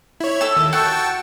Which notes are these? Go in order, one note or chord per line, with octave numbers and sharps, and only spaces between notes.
E4 C#5
A4 E6
D#2
F#4 G5 A5 C#6